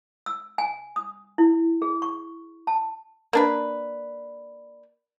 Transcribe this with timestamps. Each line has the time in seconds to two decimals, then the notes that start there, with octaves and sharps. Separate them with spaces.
0.26 E6
0.58 G#5
0.96 D#6
1.38 E4
1.82 G#4
2.02 C#6
2.67 A5
3.33 A#3 D4 B4